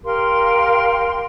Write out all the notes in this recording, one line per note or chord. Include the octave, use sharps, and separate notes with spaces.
G4 A#4 F5 C6